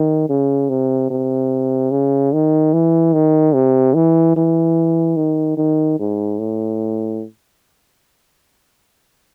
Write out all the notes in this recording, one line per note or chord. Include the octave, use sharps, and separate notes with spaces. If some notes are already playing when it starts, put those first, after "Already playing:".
Already playing: D#3
C#3
C3
C3
C#3
D#3
E3
D#3
C3
E3
E3
D#3
D#3
G#2
A2